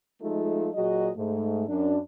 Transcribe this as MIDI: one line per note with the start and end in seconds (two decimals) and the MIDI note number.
0.21 0.69 53
0.21 0.69 56
0.21 0.69 57
0.21 0.69 63
0.21 0.69 65
0.21 0.69 69
0.74 1.09 46
0.74 1.09 54
0.74 1.09 66
0.74 1.09 68
0.74 1.09 75
1.16 1.65 44
1.16 1.65 57
1.69 1.98 42
1.69 1.98 62